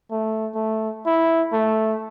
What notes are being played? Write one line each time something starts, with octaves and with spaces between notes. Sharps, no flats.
A3
A3
E4
A3